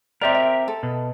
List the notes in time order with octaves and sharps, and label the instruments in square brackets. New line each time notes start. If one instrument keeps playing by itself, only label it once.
[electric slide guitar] C4 G4 A#4 [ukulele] D5 E5
[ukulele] E5
A4
[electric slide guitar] B2